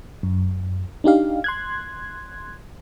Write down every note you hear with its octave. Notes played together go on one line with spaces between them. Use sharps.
F#2
D4 D#4 G4 F5
C6 F#6 G#6